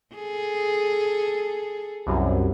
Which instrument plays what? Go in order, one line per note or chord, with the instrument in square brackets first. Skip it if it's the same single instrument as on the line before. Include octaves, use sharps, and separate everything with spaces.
[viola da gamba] G#4 A4
[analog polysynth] C2 F#2